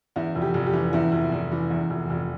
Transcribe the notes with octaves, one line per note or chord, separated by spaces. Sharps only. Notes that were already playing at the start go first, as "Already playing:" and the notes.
E2 E4
F1
G4
F1
G4
E3
E2 E4
F1
F1
E3
E2
F1
F1